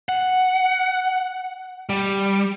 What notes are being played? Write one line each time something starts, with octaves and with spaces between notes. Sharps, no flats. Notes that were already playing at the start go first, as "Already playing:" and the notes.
F#5
G3